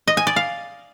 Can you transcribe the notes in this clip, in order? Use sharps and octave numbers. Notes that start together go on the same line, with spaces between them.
D#5
G#5
D5
F5